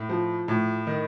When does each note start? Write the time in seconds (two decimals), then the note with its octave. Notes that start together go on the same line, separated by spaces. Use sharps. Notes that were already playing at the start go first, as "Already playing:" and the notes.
Already playing: A2
0.09 F3
0.48 A2
0.87 D#3